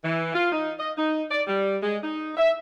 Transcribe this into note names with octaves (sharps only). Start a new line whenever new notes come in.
E3
F4
D#4
D#5
D#4
D5
G3
G#3
D#4
E5